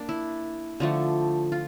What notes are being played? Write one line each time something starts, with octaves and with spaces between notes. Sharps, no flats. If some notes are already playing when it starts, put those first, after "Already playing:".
Already playing: A#3 D4
E4
D3 F3 A3
F4